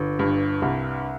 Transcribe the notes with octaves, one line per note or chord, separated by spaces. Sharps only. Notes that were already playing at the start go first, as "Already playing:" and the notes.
Already playing: G1
G2
C2